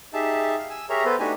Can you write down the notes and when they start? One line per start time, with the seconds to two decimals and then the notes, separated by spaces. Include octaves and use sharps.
0.13 D#4 G4 G#4 E5 A5
0.58 F5
0.70 G#5 E6
0.89 G4 G#4 A#4 C#5 E5 A#5
1.05 B3 A4 B4 C5
1.20 A3 D4 D#4 F#4 G4 G#5